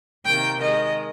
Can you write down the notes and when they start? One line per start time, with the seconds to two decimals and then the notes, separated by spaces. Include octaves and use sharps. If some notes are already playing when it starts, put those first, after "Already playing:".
0.25 C3 D#3 A#3 G5
0.61 D#3 G#3 D#5